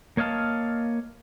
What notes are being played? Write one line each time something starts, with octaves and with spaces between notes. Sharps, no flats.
A#3 C#5 D#5 F5 A5